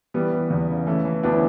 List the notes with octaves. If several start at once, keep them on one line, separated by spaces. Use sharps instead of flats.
E3 G3 B3
E3
E2
C#3
E3 A3 C#4
E3
D2 B3 D4
C#4 E4